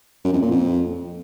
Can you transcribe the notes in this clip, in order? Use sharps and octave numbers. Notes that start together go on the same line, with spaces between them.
F#2
F2
A#2
F2